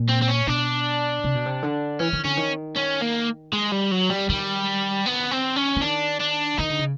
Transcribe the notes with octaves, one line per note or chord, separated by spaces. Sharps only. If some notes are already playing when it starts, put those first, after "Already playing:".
Already playing: A#2
C4
C4
C#4
B2 D4
C3
B2
C3
D3
E3 C#4
D#3
D3 C#4
D#3
C#4
A#3
G#3
G3
F#3
G3
D#3 G3
B3
C4
C#4
E3
D#3 D4
D4
D#3 D#4
D3
C#3